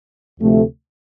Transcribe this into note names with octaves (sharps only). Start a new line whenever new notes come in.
D2 C3 F3 A3